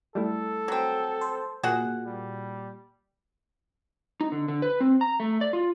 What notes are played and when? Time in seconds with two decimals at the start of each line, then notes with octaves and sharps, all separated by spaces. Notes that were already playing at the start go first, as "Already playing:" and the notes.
0.15 G3 A3 E4 A4
0.68 F#3 C4
1.21 C5
1.63 A#2 F#4 G#4 F#5
2.06 G3
4.21 D#4
4.32 D3
4.48 D3
4.62 B4
4.80 C4
5.01 A#5
5.20 A3
5.41 D5
5.53 F4